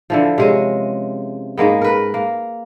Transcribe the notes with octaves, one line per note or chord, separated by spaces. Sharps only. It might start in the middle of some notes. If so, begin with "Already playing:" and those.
D3 E3 F3
C3 G#3 C#4
G#2 G#3 A#3 B3
A#4 B4
A#3